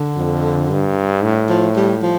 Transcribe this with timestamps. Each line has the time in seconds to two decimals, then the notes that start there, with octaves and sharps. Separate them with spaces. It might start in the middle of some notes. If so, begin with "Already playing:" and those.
Already playing: D3
0.16 F2
0.70 G2
1.23 A2
1.49 F3
1.76 G3
2.03 F3